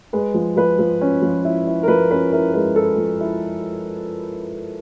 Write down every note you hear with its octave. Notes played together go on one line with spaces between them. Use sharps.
G#3 B4
F3
F3 B4
F3
C#4
F3
E4
E4
A#4
F3 B4
C#4 B4
E4 A#4
G#3 B4
E4 A4
F3
E4